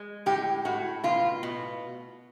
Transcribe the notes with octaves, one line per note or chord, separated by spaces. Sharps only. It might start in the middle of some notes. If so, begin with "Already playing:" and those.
Already playing: G#3
A2 G4
A2 F#4
B2 F4
B2